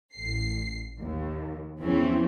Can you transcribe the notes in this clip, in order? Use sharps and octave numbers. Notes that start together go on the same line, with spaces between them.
A1 C7
D#2
E2 E3 F3 C4 C#4